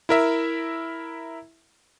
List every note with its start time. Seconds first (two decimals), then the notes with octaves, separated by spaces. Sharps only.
0.09 E4 A#4 E5